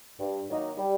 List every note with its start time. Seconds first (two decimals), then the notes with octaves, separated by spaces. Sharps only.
0.20 G2
0.49 D#3 F#3 A#3 D#4
0.78 G3